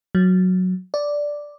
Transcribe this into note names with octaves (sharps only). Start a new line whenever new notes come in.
F#3
D5